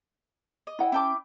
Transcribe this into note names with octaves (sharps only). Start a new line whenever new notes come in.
D#5
E4 F#5 G5
C#4 E4 G5 A5 D6